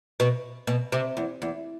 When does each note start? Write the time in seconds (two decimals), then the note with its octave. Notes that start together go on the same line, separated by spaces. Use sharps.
0.20 B2
0.67 B2
0.92 C3
1.17 E2
1.42 E2